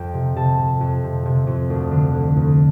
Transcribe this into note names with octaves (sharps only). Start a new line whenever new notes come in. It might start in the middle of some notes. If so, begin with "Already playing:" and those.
Already playing: F2 G5
C3
C3 A5
F2
F2
C3
C3
F2
D2
D3
D3
D2